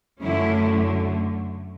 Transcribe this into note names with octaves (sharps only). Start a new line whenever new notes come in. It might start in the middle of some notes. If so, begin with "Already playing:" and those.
F#2 D3 A3 C#4 E4